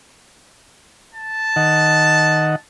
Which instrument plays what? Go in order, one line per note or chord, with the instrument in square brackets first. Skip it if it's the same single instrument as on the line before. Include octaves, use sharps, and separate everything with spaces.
[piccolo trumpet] A5
[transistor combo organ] D#3 D#5 F#5